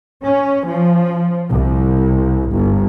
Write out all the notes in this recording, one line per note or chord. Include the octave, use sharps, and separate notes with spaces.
C#4
F3
C2
G1